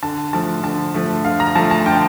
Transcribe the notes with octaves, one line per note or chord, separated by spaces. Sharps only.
D3 A5
F3 A3 A5
D3 A5
F3 A3
D3 F5
A#5
F3 A3 A5
A5
D3 G5